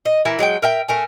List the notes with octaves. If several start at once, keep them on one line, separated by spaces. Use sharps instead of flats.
D#5
E3 E4 A#4
F#3 G#3 D5 G5
A#4 E5 G5
A3 A#4 G#5